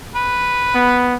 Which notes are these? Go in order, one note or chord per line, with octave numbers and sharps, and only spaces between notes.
B4
B3